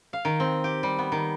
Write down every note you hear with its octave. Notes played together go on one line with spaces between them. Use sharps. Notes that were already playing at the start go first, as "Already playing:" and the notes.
F5
D#3
C4
G4
G3
B3
D#3